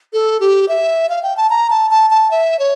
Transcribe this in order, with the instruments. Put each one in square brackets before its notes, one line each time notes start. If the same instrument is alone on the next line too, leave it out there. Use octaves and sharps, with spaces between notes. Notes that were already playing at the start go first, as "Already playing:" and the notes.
[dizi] A4
G4
E5
F5
G5
A5
A#5
A5
A5
A5
E5
C#5